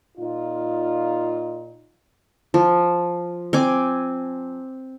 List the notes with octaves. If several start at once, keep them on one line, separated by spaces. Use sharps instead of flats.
A#2 D#4 F4
F3
C4 G#5 D6